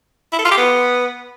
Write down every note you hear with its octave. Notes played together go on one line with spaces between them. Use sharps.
E4
A4
F4
G4
B3